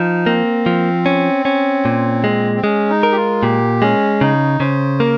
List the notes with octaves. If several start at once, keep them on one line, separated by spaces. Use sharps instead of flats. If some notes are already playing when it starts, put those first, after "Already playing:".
Already playing: F3 D#4
A#3 C4
F3
C#4
C#4
A#2
G#3
C4
G#3 C#4
D#4
A#4
G4
F4
A#2 G4
G#3 C#4
C#3 D#4
C#3 C5
A#3 A#4